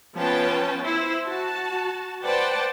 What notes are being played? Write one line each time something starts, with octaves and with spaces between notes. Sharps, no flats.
F3 B3 C#4 B4 G5 A5
E4 C5
F#4 A5
B4 C5 D5 F#5 G5 A5